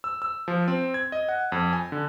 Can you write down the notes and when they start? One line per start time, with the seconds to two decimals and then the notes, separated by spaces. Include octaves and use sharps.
0.04 E6
0.22 E6
0.48 F3
0.68 C4
0.94 G#6
1.12 D#5
1.29 F#5
1.52 F2
1.73 G#5
1.92 D3